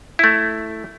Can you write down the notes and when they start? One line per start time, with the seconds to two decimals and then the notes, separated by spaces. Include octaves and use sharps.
0.19 A3 E4